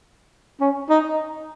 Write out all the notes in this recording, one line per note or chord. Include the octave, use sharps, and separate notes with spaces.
C#4
D#4